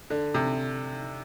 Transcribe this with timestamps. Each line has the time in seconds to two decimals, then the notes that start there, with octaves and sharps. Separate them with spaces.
0.10 D3
0.34 C3